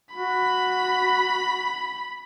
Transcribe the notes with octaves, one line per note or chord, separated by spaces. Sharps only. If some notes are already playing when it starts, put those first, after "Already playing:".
F#4 B5